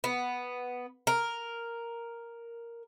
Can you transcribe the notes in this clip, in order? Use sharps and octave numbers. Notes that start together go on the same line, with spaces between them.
B3
A#4